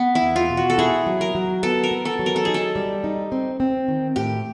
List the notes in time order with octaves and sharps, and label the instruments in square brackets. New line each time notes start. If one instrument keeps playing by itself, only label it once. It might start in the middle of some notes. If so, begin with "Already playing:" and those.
Already playing: [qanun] B3
E4
[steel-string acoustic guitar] E2
[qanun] F4
[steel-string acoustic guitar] B2
[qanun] F#4
A4
[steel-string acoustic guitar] E4 [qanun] G#4
[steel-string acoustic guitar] F#3
[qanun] A#4
[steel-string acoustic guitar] F#3
[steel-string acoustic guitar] B3 [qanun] A4
[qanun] A#4
[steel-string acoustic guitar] B3
[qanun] A4
[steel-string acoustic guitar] F#3
[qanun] A#4
A4
[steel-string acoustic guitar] D#4 [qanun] G#4
[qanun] A4
[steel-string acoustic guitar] G3
D#4
C4
C4
D#3
[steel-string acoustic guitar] A2 [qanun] G4